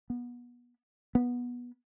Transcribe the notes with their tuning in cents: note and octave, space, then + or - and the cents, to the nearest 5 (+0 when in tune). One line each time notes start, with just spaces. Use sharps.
B3 -25
B3 -15